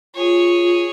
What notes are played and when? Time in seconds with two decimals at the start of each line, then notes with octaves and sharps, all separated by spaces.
0.15 F4 G#4 C#5